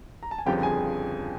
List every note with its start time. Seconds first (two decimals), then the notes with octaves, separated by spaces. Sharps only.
0.23 A#5
0.31 A5
0.38 G#5
0.46 G1 F2 C#3 F3 G4 G5
0.63 G#4 G#5